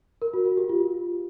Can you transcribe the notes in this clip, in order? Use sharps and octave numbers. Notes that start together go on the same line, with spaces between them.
A#4
F#4
F#4
G4
F4